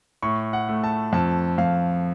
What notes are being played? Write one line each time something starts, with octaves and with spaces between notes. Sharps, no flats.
A2 C#6
F#5
A3
A5
F2 A5
F2 F5